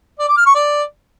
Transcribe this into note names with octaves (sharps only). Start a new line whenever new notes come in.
D5
D6
F6
C#6
D5